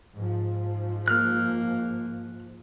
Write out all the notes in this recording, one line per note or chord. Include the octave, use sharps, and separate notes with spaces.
G#2 F3
A#3 F6 F#6